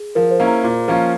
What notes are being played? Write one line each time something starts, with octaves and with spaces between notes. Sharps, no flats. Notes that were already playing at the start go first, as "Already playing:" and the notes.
Already playing: G#4
F3 A#4
C5
A#3 C#4 E4
A#5
A#2
F3 A#3 C#4 F4